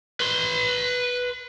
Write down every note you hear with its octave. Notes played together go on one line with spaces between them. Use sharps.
B4 C6